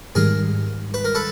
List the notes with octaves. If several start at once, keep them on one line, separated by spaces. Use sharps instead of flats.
G#2 D#3 G3 G#4 A#4
B4
A#4
A4 B4